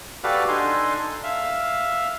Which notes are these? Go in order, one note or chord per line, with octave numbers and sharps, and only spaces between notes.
F#4 G4 A4 B4 D5 F5
D4 D#4 A4 G#5 C6
E5 F5